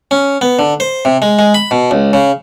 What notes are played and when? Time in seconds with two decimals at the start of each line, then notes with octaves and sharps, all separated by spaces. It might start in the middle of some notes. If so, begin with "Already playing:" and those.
0.11 C#4
0.41 B3
0.59 D3
0.80 C5
1.05 C3
1.22 G#3
1.39 G#3
1.54 B5
1.71 B2
1.91 C#2
2.13 C#3